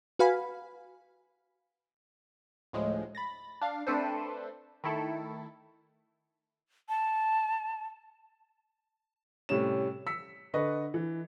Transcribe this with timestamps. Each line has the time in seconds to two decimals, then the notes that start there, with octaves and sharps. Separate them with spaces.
0.19 F#4 B4 F5 G#5 B5
2.73 D2 A2 F3 G#3
3.15 B5 A6 A#6
3.61 D4 F5
3.87 A3 C4 D4 A4 B4 C5
4.84 D#3 A3 E4 A4
6.89 A5
9.49 A2 C3 G3 C#4 E7
10.07 E6 B6 C#7
10.54 D3 B4 D#5 C#6
10.94 E3